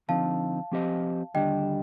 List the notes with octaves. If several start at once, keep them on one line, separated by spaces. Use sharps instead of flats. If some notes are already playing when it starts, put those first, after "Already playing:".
D3 F3 C4 D#4 F5 A5
F3 C4 G4 C5 D#5
D#2 D3 G3 D4 D#5 G5